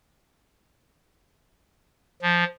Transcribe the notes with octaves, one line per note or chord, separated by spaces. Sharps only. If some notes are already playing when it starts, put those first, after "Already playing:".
F3